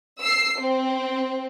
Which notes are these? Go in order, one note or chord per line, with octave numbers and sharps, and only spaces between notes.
E6 C7
C4